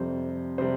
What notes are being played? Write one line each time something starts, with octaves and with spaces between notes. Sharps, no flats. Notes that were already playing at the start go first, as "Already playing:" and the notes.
Already playing: F2 C3 G3 C5
C3 G3 C5